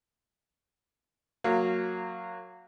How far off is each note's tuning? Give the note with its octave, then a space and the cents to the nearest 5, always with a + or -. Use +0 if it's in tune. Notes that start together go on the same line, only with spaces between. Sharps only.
F#3 -15 A#3 -20 F5 +0